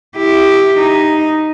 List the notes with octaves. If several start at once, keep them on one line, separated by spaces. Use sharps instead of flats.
E4 G4
D#4